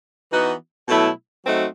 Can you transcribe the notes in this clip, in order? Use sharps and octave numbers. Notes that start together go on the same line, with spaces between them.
E3 B3 D#4 F#4
B2 F#3 A3 E4
F#3 A3 C4 D#4 F#4